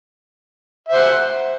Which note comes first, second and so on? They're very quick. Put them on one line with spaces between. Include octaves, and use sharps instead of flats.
E5 C5 F#5